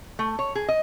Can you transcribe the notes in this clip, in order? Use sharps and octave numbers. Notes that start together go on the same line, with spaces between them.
A3
C#5
G#4
D#5